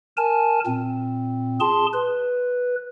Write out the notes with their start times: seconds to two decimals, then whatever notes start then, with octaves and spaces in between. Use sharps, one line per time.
0.17 A#4 G#5 A5
0.66 A#2 C4
1.60 G#4 A5 C6
1.93 B4